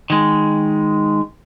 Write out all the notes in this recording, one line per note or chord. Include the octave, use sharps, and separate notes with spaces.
D#3 G#3